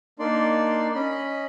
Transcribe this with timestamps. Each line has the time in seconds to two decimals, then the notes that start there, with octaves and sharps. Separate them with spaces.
0.19 A#3 D4 D#4 D5 C6
0.95 C#4 D#5 B5